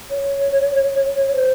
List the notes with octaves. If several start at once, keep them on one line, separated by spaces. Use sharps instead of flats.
C#5
C5